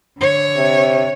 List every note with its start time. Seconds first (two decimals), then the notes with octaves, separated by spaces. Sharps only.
0.18 D3 C#5
0.56 C3